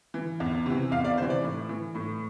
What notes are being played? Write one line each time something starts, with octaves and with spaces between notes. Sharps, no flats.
E3
E2
C3 E3
E2 F5
D5
C3 E3 C5
D5
A2
E3
A2